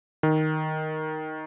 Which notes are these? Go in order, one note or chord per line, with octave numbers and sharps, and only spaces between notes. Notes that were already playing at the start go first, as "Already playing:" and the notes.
D#3